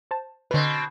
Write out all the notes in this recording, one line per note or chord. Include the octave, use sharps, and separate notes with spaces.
C5 A5
B2 D3 C4 B4